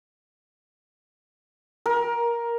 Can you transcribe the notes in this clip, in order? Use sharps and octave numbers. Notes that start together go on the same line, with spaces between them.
A#4